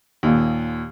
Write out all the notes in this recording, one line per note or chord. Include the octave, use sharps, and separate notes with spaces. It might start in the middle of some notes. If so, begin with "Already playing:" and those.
D#2 A#2